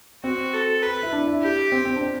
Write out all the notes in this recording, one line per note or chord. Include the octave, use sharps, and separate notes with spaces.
C4 F#4
A4
B4
E4
D4
E4
G4
C4
C4
D4
C4